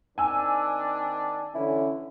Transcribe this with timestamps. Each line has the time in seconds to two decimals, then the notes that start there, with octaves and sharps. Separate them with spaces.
0.18 D#3 C4 D4 G#5 E6
1.55 D3 E3 C#4 E4